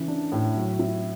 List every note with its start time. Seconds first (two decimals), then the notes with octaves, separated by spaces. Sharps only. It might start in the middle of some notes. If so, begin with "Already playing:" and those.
Already playing: C#3 E3
0.08 D4
0.32 A2
0.55 F#3
0.79 E4